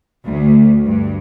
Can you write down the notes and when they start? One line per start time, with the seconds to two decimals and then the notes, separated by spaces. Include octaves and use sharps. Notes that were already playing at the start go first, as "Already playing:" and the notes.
0.24 D2
0.85 G2